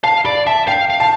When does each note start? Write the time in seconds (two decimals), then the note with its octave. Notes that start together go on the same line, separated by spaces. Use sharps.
0.04 F5 A5
0.25 D5 B5
0.47 E5 A5
0.68 F5 G5
0.90 F5
1.00 A5